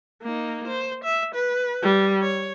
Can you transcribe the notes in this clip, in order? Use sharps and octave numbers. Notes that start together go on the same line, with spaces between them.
A#3 D#4
C5
E5
B4
G3
C#5